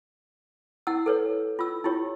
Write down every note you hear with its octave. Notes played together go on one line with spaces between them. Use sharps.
E4 F#5 E6
A4 B4 C#5
F4 E6
E4 F4 G4 C#5